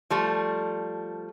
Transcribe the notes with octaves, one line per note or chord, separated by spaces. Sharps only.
F3 G3 A3